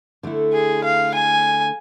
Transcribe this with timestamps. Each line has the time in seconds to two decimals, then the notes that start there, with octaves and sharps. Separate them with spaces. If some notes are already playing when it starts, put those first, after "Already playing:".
0.23 D3 A3 E4
0.53 G#4
0.84 F5
1.15 G#5